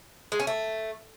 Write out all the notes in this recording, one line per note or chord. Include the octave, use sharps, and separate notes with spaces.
G#3
C#4
A3